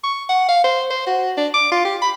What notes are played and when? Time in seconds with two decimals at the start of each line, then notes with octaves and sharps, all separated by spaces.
0.04 C#6
0.29 F#5
0.49 F5
0.64 C5
0.90 C5
1.07 F#4
1.37 D4
1.54 D6
1.72 F4
1.85 G4
2.02 B5